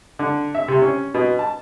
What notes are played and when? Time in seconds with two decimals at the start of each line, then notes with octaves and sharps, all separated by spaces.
0.19 D3
0.55 E5
0.68 C3
0.82 C#4
1.14 B2
1.39 A5